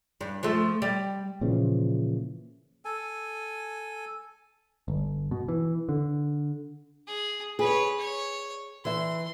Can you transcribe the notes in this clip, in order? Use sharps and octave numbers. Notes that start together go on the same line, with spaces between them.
G2
F3 A3
G3
A#2 C#3 E3 F3
A4 G#5
G1
B2
E3
D3
G#4
G#4 B4 C#5
C#5
E3 E5 C6